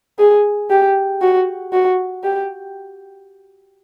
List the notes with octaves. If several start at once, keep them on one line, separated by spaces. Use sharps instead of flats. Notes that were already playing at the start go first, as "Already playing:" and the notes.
G#4
G4
F#4
F#4
G4